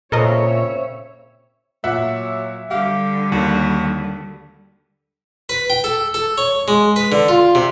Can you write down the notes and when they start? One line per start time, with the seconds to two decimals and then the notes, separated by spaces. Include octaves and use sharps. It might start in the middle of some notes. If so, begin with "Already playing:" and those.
0.12 A#2 C#3 C4 A4 A#4 C#5 D#5 E5
1.84 A#2 F#3 E5 F#5
2.71 D3 G3 G4 F5
3.32 D#2 F#4
5.49 B4
5.70 G5
5.84 A4
6.14 A4
6.38 C#5
6.68 G#3
6.96 B4
7.12 D3
7.28 F4
7.55 C3